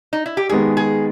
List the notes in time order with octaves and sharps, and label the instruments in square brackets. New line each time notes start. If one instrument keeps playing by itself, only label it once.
[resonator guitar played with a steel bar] D#4
E4
G4
[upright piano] D#3 G#3 B3 [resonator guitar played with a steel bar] G#4
[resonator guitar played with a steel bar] G#4